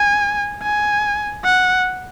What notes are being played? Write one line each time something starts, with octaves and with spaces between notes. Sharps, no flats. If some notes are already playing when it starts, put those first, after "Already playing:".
Already playing: G#5
G#5
F#5